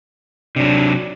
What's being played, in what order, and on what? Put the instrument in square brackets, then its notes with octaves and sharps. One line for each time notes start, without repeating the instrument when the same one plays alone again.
[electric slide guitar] C3 F#3 [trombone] D4